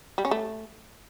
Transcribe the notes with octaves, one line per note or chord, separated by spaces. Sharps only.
G3
C#4
A3